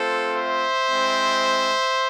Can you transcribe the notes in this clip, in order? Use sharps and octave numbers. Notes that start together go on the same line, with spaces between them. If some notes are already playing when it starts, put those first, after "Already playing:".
Already playing: A3 C4 F4 A4 C5
C5 E5
G#3 C4 E4